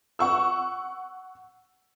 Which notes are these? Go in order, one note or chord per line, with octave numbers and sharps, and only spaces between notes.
F#5 C#6 E6